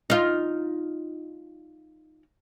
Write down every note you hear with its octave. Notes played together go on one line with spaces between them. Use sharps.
D#4 F4